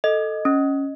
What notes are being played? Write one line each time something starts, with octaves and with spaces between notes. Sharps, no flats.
A4 D#5
C#4